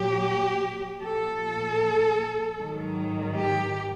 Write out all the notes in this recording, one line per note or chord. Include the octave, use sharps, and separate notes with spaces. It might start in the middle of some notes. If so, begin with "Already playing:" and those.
Already playing: A#2 F#3 G4
A#2 F3 A4
G#2 D#3 F#3
G4